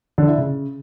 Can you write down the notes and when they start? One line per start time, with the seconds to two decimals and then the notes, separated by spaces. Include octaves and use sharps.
0.18 D3
0.28 E4
0.38 C#3